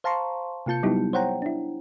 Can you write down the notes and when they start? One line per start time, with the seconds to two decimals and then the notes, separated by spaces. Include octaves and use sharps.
0.04 C5 F5 A5 A#5 C6 C#6
0.66 C3 A#3 F4 A5 G6 C#7
0.83 F#3 G3 B3 D#4 E4 G4
1.13 C5 C#5 F#5 G5 A#5
1.42 D4 E4